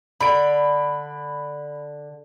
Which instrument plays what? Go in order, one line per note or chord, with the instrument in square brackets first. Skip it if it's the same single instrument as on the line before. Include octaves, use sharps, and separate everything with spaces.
[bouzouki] D3 [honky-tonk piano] B5 D7